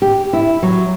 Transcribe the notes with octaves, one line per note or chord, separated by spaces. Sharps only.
G4
E4
F#3